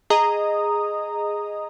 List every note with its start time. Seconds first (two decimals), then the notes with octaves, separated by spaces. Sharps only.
0.10 G#4 D#5 A#5 D#6